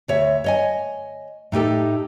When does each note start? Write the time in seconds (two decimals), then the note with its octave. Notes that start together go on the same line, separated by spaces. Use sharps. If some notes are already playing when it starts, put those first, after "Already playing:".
0.08 D2 C#5 E5
0.44 C#5 D#5 G#5
1.52 A2 D#4 G4 A4